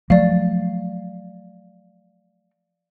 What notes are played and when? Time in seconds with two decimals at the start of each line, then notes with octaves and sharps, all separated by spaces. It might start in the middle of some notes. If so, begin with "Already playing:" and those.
0.10 F3 F#3 A3 D5 F5